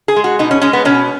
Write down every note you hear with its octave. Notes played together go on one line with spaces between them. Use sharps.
G#4
G#3
F#4
B2 D#4
C#4
G#3 C#4
B3
B2 C#4